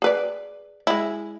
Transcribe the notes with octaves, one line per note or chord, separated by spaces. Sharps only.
G#4 B4 D5
G#3 E4